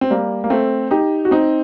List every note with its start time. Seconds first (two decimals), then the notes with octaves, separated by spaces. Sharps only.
0.01 C4
0.10 G3 A#3
0.44 A#3
0.50 A3 C4
0.91 D#4 G4
1.25 F#4
1.31 C4 D#4